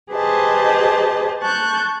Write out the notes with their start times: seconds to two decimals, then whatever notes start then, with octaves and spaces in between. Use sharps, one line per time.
0.13 G4 G#4 B4 C5 D#5 A5
1.41 A5 C#6 F#6 G6